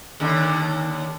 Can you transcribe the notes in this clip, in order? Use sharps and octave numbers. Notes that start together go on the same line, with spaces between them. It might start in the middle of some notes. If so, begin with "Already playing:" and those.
D#2 D3